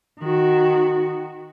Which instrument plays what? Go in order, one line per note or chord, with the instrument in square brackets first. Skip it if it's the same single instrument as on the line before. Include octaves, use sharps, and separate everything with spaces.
[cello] D#3 F#4